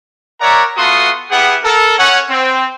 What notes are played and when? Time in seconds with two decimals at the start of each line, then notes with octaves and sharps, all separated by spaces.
0.41 A#4 C#5 D5 E5 F#5 A#5
0.77 A3 B3 F4 F#4 C6 D#6
1.31 B3 E4 G4 G#4 F#5
1.64 A4 A#4
1.99 C#4 C#5 F#5
2.29 C4